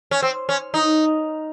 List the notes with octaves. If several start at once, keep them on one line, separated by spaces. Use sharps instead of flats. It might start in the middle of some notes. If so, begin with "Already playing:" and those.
C#4
C4
C#4
D#4